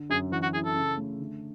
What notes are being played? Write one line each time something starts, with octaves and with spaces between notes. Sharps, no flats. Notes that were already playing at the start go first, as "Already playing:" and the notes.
Already playing: D3
F#2 G#4
E3 F#4
F#4
E4 G#4
A4
C#3
A3
D3